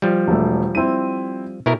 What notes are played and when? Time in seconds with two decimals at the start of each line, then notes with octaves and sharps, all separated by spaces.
0.02 F3 G3
0.28 E1 A3
0.75 C4 E4 D#7
1.66 B2 E4 A#4